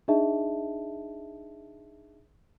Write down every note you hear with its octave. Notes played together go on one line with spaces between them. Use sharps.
D4 D#4 G#4 D#5 E5 A5